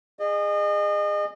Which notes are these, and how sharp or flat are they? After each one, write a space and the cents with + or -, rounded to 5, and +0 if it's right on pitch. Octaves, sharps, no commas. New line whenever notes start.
G#4 -15 D#5 -35